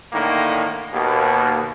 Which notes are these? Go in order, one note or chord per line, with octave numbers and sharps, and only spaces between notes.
A2 D3 D#3 A#3
D#2 B2